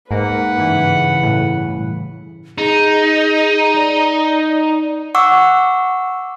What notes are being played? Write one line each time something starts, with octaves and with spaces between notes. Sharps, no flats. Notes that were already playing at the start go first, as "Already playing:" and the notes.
G#2 A#3 B4 F#5
G2 C#3 E3
A2
D#4 G#4
D5
F#5 C#6 D6 E6